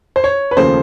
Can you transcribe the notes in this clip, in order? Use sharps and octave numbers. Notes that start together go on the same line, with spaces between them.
C5
C#5
B4
D#2 C#3 F3 A3 C5